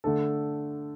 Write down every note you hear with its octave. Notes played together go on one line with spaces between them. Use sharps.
D3 A3 D4 A4